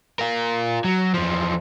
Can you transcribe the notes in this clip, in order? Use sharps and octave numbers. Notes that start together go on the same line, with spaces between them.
F4 A#4
F#3
E2 F3